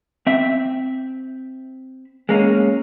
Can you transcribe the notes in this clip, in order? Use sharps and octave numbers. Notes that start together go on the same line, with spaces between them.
C4 E5
G#3 A#3 C#4